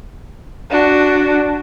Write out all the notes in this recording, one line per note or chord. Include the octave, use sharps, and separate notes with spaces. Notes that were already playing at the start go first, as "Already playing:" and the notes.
D4 F#4